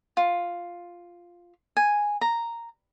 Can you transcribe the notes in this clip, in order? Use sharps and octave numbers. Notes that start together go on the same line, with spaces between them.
F4
G#5
A#5